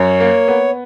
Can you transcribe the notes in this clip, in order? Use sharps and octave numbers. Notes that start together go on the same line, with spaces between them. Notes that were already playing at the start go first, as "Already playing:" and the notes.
Already playing: F#2 C#5
A#3
B3